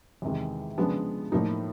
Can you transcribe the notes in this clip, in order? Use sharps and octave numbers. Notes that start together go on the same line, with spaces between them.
E2 C3 D#3 G#3
C#3 F3 G#3 B3 D4
A2 F3 A#3 D#4